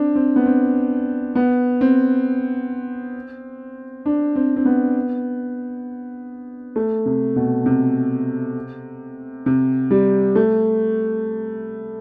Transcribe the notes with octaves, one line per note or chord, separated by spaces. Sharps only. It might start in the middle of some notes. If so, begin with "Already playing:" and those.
Already playing: C4 D4
C4
B3
C4
B3
C4
D4
C4
C4
B3
A3
C3
B2
C3
C3
G3
A3